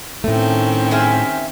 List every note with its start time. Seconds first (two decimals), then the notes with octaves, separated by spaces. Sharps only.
0.24 A2 D#3 A3 C4 C#4
0.91 G#4 E5 F5